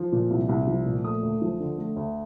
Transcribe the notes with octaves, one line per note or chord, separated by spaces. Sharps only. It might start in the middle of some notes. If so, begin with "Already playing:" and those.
Already playing: F3
A#2
C2
C2
F3
A#2
A3 D#6
D2
F3
D3
A3
D2